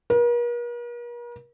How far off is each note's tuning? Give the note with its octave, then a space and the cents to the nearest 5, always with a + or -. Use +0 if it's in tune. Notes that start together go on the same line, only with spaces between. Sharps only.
A#4 +45